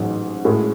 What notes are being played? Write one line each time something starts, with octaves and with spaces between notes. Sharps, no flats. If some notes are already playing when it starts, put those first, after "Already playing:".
Already playing: A1 G#2 F#3
A2 G#3 C#4 F#4